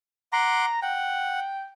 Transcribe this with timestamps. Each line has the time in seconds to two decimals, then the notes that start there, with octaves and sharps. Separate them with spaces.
0.33 F#5 A#5 C6 D6
0.82 F#5 G5